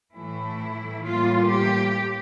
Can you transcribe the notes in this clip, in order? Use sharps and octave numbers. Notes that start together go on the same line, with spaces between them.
A2 E3 A3 E4
A2 E3 G3 A#3 F4
G4